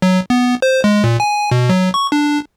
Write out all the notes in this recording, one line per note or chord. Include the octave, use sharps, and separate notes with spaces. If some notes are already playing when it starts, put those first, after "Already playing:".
F#3
B3
C5
G#3
A#2
G#5
B2
F#3
C#6
D4